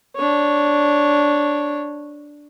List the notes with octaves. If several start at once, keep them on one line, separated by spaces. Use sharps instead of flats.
D4 C#5